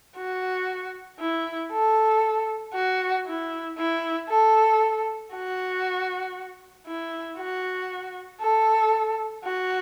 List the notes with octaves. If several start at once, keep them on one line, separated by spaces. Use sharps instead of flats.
F#4
E4
A4
F#4
E4
E4
A4
F#4
E4
F#4
A4
F#4